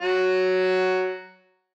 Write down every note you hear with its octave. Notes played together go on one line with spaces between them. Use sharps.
F#3 F#4